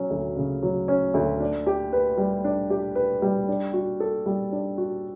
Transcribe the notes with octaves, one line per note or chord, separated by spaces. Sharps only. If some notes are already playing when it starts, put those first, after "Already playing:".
Already playing: F#3 C#4
D2
C#3
F#3
C#4
D2
D4
G4
B4
G3
D4
G4
B4
G3
D4
F#4
A4
G3
D4
F#4